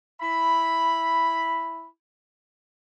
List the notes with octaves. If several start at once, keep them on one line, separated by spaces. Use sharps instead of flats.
E4 E5 B5